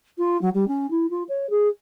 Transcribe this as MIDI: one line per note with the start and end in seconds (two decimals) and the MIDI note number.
0.18 0.40 65
0.42 0.50 54
0.54 0.68 55
0.68 0.89 61
0.91 1.06 64
1.10 1.24 65
1.29 1.50 73
1.50 1.68 68